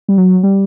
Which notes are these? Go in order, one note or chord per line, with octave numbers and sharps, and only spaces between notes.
G3
F#3
G3